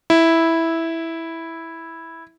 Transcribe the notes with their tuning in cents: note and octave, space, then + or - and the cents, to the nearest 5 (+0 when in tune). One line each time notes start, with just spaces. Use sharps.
E4 -5